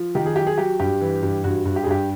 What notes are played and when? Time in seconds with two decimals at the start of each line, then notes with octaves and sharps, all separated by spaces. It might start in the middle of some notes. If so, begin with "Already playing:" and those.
Already playing: F3
0.15 D#3 G4
0.26 G#4
0.36 F#3 G4
0.47 G#4
0.58 F#3 G4
0.80 G2 G4
1.01 E3
1.23 G2
1.44 G2 F#4
1.65 G2
1.76 G4
1.84 G#4
1.87 G2 G4